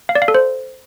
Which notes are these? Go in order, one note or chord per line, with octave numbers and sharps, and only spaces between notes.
F5
D5
F5
A4
C5